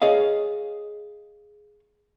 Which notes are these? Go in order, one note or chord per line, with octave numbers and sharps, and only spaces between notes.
G#4 C#5 D#5 F5